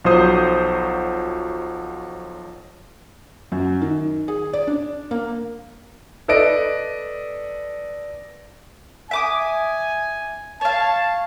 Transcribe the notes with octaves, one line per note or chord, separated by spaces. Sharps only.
B1 F3 F#3 C5 D#6
F#2
D#3
G#4
D5
D4
A#3
A4 B4 D5 D#5 D7
E5 G#5 D6 D#6
C#5 F5 A5